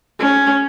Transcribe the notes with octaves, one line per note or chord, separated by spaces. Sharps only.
C#4